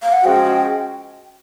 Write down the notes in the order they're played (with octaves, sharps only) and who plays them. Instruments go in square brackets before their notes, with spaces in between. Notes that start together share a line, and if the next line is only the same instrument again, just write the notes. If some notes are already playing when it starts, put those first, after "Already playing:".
[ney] F5
F#5
[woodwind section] F3 G#3 C#4 F#4 [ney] G5